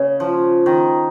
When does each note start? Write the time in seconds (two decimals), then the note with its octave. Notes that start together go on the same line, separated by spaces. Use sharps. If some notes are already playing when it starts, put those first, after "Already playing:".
Already playing: C#3
0.20 F3
0.66 D#3